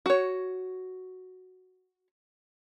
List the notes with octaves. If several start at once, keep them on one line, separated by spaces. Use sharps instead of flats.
F#4 C#5